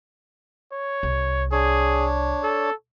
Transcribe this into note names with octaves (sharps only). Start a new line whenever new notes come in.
C#5
C2
D4 G#4 C#5
A4